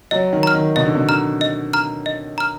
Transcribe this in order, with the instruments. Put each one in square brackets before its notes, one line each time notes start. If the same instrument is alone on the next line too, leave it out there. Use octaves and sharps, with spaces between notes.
[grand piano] F#3 [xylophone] D#5
[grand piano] D#3
[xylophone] A#5 F6
[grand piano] D#3
[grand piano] B2 [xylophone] D#5
[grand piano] D3
B2
[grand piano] D3 [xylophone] A#5 F6
[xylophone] D#5
A#5 F6
D#5
A#5 F6